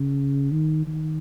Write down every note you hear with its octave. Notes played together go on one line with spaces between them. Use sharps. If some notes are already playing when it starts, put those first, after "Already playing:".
Already playing: C#3
D#3
D#3